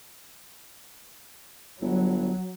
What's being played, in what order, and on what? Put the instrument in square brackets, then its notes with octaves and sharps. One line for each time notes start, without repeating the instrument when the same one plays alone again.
[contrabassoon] G1 [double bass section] F#3